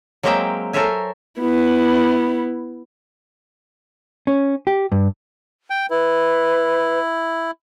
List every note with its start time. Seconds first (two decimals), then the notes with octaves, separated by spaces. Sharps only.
0.23 F#3 G#3 A#3 C4 E5 G5
0.73 A4 A#4 C5 C#5 E5 G#5
1.40 B3 E4
4.27 C#4
4.67 G4
4.92 G2
5.70 G5
5.90 E4 B4